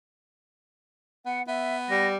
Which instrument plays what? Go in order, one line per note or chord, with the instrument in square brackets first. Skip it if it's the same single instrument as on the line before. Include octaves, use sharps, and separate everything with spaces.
[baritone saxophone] B3 [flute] F#5
[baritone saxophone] B3 [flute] E5
[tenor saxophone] G3 [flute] A#6